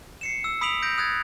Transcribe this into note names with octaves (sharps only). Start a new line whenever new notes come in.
C7 C#7 E7
E6
B5 D#6 B6 D7 F7 F#7
G6 A#6 D7
D#6 F#6 G#6 A6